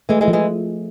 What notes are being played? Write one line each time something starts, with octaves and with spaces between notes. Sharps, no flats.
E3 G#3 A3
E3 G#3
F3
E3 G#3